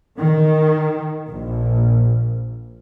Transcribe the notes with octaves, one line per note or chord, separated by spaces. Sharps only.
D#3
A#1